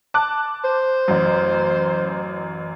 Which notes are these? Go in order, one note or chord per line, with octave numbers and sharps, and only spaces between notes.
A5 D6 F#6
C5
A1 F#2